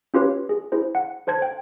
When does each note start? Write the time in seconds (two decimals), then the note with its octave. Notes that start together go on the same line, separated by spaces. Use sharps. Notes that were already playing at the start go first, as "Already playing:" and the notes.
0.14 C#4 F4 G4 B4 C#5
0.49 G#4
0.72 E4 G#4 C5
0.95 F#5
1.27 A4 C5 A5 G#6
1.42 G5